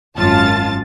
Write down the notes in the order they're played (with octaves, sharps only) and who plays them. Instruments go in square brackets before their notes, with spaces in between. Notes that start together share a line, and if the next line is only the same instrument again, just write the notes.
[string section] G#1 F#2 F4 A5 A6